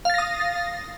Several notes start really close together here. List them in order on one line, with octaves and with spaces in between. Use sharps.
F5 A6 A#6 D#6